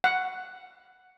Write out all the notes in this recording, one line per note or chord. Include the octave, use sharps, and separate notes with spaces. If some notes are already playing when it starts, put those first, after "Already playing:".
F#5